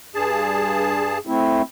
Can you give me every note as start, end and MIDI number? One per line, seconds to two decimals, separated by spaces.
0.15 1.18 43
0.15 1.18 68
0.15 1.18 81
1.27 1.62 57
1.27 1.62 60
1.27 1.62 64